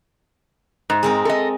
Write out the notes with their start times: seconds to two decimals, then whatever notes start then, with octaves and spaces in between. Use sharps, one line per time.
0.90 G#2
1.03 G#3 C4 A#4
1.25 A4 D#5